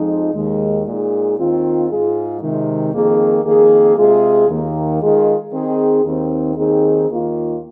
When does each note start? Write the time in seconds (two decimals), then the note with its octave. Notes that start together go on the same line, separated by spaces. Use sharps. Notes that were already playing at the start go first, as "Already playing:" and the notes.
Already playing: F2 F3 G#3 D#4
0.35 D#2 D#3 G#3
0.86 A#2 G#3 D#4 G#4
1.38 D#2 D#3 C4 F4
1.89 G#2 G#3 F4 G#4
2.42 C3 D#3 G#3
2.94 F2 D#3 A#3 G#4
3.45 F2 D#3 A#3 G#4
3.98 C3 G#3 F4 G#4
4.49 D#2 D#3 A#3
5.01 D#3 G#3 F4 G#4
5.52 D#3 C4 D#4 G#4
6.04 D#2 D#3 C4
6.56 D#2 D#3 C4 D#4 G#4
7.09 D#2 D#3 A#3 F4